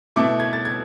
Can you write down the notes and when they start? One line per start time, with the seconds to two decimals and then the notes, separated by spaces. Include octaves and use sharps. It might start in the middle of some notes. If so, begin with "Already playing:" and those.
0.16 B2 A3 E4 D6
0.40 G#6
0.53 A6
0.65 G#6